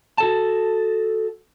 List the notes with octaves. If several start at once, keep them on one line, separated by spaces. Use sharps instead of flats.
F#4 A4 A5